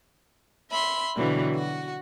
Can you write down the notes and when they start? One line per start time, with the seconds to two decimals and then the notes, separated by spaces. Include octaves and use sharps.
0.70 E5 B5 C6
1.15 B2 D3 E3 F#3 G3
1.54 F#4